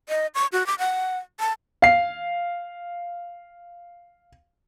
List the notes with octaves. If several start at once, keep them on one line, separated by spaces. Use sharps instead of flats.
D#5
C#6
F#4
D6
F#5
A5
F5 C7